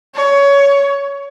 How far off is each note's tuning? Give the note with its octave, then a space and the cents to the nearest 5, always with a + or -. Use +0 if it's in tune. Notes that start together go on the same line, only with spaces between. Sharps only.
C#5 +20